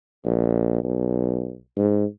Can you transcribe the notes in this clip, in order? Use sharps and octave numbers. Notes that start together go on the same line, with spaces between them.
A#1
B1
G#2